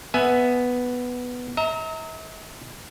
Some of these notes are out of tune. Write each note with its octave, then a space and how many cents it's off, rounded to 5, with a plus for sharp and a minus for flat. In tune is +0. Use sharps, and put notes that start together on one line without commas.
B3 +0 E5 +0 G#5 +10
E5 -45 A#5 -20